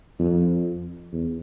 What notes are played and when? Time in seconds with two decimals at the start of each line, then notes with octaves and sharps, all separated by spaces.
0.19 F2
1.12 E2